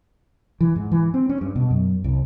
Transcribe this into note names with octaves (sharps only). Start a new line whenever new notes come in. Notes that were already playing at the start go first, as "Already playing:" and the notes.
E3
G#2
E3
C4
C#4
G2
B2
F#2
C2